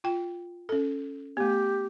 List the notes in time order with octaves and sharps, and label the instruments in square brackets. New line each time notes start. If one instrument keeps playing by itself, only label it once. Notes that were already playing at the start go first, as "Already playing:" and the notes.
[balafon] F4 G5
C#4 A4
[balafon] A3 B3 [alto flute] G4